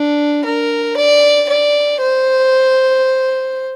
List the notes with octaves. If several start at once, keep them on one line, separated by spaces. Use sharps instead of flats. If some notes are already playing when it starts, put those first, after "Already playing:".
Already playing: D4
A#4
D5
D5
C5